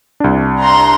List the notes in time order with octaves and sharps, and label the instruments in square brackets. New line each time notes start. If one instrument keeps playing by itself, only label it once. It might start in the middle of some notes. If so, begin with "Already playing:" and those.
[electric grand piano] C2 D4
[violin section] A#5 C6